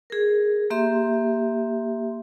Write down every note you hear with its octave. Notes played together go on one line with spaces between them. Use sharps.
G#4 A#4
A#3 G4 E5 C6